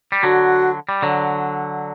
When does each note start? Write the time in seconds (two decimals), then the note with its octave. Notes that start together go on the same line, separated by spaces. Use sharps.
0.12 G3
0.23 D3 F#3 F#4
0.89 G3
1.02 D3 F#3